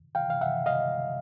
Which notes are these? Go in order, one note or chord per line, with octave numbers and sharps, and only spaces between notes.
F5 G5
F5
E5 F#5
D#5 F5